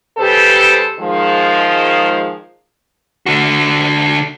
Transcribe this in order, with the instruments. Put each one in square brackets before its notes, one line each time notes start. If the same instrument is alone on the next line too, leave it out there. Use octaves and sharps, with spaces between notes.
[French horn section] C#3 G3 G4 A4 B4 C5
D#3 F3 G#3
[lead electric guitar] D3 F#4